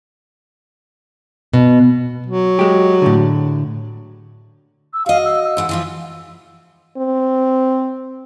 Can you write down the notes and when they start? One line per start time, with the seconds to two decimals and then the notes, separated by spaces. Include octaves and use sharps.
1.53 B2
2.27 F#3
2.59 G#3 G4
3.02 A2 D3
4.94 E6
5.06 F#4 D#5 F5
5.25 E6
5.44 E6
5.57 G#2 E3 F#5
5.69 E3 F3 F4
6.97 C4